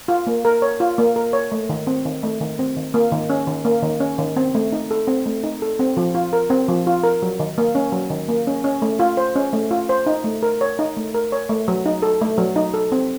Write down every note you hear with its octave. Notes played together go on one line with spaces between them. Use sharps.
F4
A#3
A#4
C#5
F4
A#3
A#4
C#5
A3
D#3
C4
D#3
A3
D#3
C4
D#3
A#3
D#3
C#4
D#3
A#3
D#3
C#4
D#3
C4
A3
D#4
A4
C4
A3
D#4
A4
C4
F3
F4
A#4
C4
F3
F4
A#4
F#3
D#3
A#3
C#4
F#3
D#3
A#3
C#4
C#4
A3
F4
C5
C#4
A3
F4
C5
D#4
A3
A#4
C#5
D#4
A3
A#4
C#5
A3
F#3
D#4
A4
A3
F#3
D#4
A4
C4